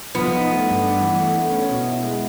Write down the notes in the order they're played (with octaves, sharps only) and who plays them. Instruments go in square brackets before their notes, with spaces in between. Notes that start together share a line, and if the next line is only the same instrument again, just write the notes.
[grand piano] F3 [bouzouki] B3
[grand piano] D#4
A3
G2
D4
E3
A3
A3
C#4
B2
E4
G#3